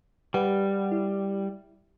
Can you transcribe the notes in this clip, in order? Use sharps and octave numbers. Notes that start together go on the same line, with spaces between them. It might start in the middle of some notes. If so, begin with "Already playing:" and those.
G3 G4 B4 F#5
E4